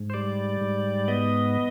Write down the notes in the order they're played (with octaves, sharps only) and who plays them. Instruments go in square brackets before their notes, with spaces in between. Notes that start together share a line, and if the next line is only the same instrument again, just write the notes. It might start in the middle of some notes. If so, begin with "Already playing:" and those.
Already playing: [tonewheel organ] G#2
C5
G3 D5
G#2
B3 D#5